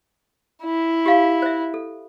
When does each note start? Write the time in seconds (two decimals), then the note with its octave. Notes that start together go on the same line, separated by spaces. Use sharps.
0.64 E4
1.06 G4 F5 C#6
1.42 C5 E5
1.74 A4